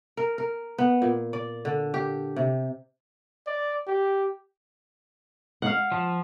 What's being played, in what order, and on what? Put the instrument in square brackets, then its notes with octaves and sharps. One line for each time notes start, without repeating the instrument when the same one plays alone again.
[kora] A#4
A#4
B3
A#2
D5
D3
G4
C3
[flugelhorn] D5
G4
[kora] F5 F#5
[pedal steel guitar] F3